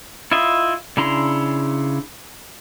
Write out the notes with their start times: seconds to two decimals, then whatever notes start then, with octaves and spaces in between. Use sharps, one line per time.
0.32 E4 F4 D#5 E5
0.97 C#3 D4 E4 A#5 C6